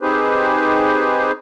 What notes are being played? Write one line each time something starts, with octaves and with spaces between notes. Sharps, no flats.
C4 D#4 G4 G#4 B4 C5